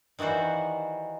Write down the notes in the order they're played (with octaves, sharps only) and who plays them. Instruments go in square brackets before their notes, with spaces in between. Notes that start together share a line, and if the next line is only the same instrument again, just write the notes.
[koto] D#3 E3 G3 F#4 C5